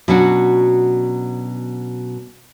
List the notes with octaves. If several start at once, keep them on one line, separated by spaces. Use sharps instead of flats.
B2 F#3 C#4 D4 F#4